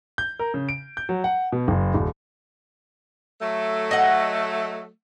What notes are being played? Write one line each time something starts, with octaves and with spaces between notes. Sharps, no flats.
G6
A#4
C#3
D7
G6
F#3
F#5
B2
F#1
D#1
F#3 A3
D#5 F#5